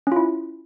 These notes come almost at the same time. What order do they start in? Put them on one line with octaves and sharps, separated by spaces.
C#4 F4 E4